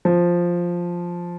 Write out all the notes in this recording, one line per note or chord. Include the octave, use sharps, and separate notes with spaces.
F3